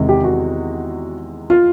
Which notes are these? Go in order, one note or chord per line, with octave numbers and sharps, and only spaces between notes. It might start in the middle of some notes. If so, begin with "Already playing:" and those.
Already playing: E2 C3 D#3 G#3
G4
F#4
F4